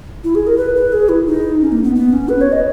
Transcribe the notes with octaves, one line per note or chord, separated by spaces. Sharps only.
E4
G#4
A#4
B4
B4
G#4
E4
D#4
C#4
A#3
B3
B3
C#4
B4
C#5
D#5